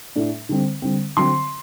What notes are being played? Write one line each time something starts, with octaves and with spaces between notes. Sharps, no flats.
A2 A3 D4
D3 G3 C4
D3 G3 C4
D3 F#3 C4 C6